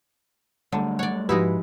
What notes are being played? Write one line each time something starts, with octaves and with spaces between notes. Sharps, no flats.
D3 F#3 G3 A3
C#5 D5 F#5
G#2 F3 G#3 D#4 E4 F#4 G4 B4